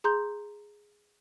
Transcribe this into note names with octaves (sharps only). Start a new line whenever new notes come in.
G#4 A#5 C6 G6